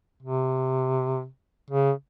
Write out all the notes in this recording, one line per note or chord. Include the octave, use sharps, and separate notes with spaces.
C3
C#3